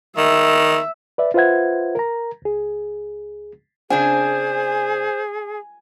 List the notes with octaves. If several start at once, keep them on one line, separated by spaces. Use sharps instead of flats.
D#3 E5
B4 D5 E5
F4 B4 C5 E5 F#5 G#6
A#4 A#5
C#2 G#4
C#3 C4 D4 G#4 C5 G#5